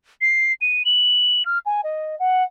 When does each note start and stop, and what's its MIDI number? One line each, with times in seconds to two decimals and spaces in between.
0.21 0.52 96
0.61 0.83 99
0.85 1.45 102
1.45 1.58 89
1.66 1.81 80
1.84 2.16 75
2.19 2.43 78